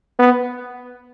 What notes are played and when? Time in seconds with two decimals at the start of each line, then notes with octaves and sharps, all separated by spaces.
0.19 B3